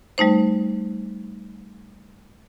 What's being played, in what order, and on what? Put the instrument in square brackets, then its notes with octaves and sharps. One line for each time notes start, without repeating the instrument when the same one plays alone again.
[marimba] G3 A3 D#4 C5